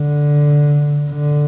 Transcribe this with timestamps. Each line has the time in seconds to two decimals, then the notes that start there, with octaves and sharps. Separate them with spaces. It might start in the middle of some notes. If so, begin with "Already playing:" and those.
Already playing: D3
1.10 D3